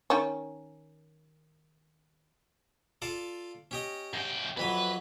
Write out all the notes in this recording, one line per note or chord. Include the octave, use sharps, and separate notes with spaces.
D#3 C#4
F4 A4 D5
C#4 G4 D#5
F#2 G5
F2 E3 F#3 B4